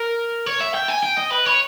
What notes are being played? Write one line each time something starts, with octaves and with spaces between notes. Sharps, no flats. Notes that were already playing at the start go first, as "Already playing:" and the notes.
Already playing: A#4
C#5
E5
G5
G#5
G5
D#5
B4
C#5